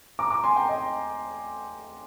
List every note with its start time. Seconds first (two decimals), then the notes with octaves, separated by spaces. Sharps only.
0.19 A#5 D6
0.30 A#5 D6
0.44 G#5 C6
0.56 G5 A#5
0.69 D#5 G5